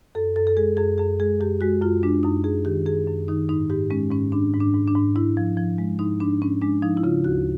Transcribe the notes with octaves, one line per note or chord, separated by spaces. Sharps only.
F#2 A4
F#2 A4
A4
G#3 G#4
F#2 G#4
F#2 G#4
G#3 G#4
F#2 G4
G#3 F#4
F#2 F4
G#3 D4
F#2 D#4
F#2 G#4
D#3 G4
F#2 G#4
F#2
D#3 D#4
G#2 D#4
G#2 G4
G#3 C#4
G#2 C#4
G#2 D4
G#2
D4
G#2
D4
G#2
G#2 E4
F3
F3
G#3
G#2 D#4
G#2 D4
G#2 C#4
G#3 D4
F3 D#4
E4
C#3 F4
D2 F#4